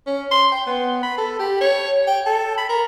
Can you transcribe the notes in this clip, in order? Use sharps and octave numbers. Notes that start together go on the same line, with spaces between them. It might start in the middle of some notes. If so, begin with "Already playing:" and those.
C#4
C6
G5
B3
B5
A4
G4
C#5
G5
A4
B5
A#4